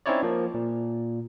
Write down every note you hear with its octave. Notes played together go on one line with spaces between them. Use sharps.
C4 C#4 D#4 E4 C#5 D5
F3 A#3
A#2